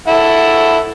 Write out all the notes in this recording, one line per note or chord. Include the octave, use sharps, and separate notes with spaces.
E4 A4 F#5